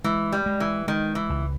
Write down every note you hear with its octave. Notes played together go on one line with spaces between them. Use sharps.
E3 G#3
G3
G#3
E3
D#3 G#3
E3
C#2